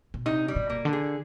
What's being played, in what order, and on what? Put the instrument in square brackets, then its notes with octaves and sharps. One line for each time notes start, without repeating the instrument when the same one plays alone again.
[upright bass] B2
[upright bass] C3 [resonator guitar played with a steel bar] D#4
[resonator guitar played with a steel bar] G3
[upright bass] B2
[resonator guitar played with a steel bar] A#3
[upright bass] D3
[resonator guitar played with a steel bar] G#4